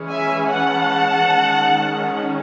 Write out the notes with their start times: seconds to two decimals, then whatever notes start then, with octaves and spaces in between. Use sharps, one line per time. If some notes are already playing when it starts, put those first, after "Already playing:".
Already playing: E3 G#3 C#4
0.10 E5 G#5
0.50 F#5 A5
1.30 D#3 G#3 C#4